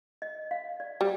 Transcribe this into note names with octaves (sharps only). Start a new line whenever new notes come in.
D#5
F5
D5
G3